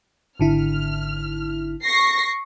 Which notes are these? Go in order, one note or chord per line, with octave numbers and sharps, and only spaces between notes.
G#1 D3 E4 F6
C#6 A#6 C7